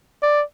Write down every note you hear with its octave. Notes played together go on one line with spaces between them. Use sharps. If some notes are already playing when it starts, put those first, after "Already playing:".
D5